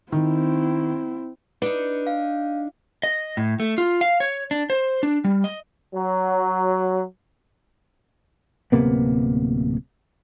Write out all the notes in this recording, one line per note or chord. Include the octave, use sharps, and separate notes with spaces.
D#3 C4 E4
D4 D#4 B4
F5
D#5
A2
A3
F4
F5
C#5
D4
C5
D4
G3
D#5
F#3
D1 C3 A#3 B3